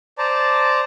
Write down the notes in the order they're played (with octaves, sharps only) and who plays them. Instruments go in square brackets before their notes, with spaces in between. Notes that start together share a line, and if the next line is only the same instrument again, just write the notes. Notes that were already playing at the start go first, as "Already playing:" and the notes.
[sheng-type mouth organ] C5 D5 A5 A#5